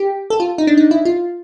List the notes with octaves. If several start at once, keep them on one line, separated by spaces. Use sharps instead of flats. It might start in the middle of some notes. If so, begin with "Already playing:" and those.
Already playing: G4
A4
F4
D#4
D4
D#4
E4
F4